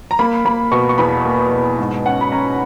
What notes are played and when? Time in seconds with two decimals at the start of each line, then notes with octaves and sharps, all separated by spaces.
0.11 A#5
0.19 A#3 B5
0.45 A#3 B5
0.72 B2 C#6
0.89 C#6
0.98 E2 B5
1.25 A#3
1.51 B2
1.79 G#2
2.05 C#4 F#5
2.21 B5
2.32 C#4 A#5